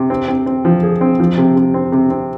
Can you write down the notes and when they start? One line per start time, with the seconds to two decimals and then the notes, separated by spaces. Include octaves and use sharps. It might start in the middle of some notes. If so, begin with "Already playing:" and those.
Already playing: C3
0.10 C4
0.28 C4
0.46 C4
0.65 F3
0.83 G#4
1.01 C4
1.20 F3
1.38 C3
1.56 C3
1.74 C4
1.92 C3
2.10 C4